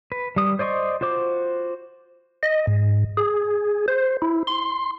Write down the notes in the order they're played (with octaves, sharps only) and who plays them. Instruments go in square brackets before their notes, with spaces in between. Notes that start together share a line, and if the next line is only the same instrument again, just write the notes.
[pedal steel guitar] B4
G3 D#6
C5 D5 D#5 C6 C#6
F4 F#4 C5 D6
[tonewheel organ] D#5
G#2
G#4
C5
E4
C6